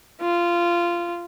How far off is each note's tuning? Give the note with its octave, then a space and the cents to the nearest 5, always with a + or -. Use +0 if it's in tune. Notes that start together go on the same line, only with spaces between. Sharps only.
F4 -15